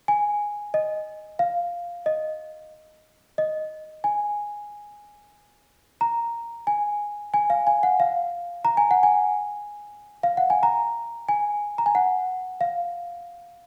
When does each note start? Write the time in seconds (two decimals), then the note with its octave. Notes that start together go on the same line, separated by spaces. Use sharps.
0.08 G#5
0.74 D#5
1.39 F5
2.06 D#5
3.38 D#5
4.04 G#5
6.01 A#5
6.67 G#5
7.34 G#5
7.50 F5
7.67 G#5
7.83 F#5
8.00 F5
8.65 A#5
8.77 G#5
8.91 F#5
9.03 G#5
10.23 F5
10.37 F#5
10.50 G#5
10.63 A#5
11.29 G#5
11.78 A#5
11.86 G#5
11.95 F#5
12.61 F5